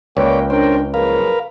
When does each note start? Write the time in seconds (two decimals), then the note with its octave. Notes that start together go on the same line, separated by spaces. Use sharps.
0.17 C#2 A#3 B4 C#5 D5 G5
0.50 C#4 D4 A#4 C5 G5
0.94 F#1 C#3 F3 A#4 B4 F5